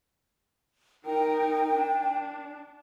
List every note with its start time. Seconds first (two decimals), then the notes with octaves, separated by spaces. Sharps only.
1.05 D#4 A#4 G5
1.75 D4